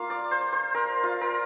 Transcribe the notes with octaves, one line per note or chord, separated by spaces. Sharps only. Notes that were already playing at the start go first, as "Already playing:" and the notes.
Already playing: A#3 F4 F5
D5
C5
C5
A#4
F4
A#4